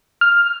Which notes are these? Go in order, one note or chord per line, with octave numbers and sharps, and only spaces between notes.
F6